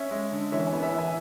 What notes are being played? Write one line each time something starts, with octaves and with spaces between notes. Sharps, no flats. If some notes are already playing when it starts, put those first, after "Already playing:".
Already playing: C#4 C#5 E5
G#3
D3
E3 C#5 E5
E5 G#5
B3
E5 G#5
E3
E5 G#5